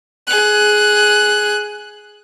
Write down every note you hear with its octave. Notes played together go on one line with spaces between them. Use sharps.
G#4 F#6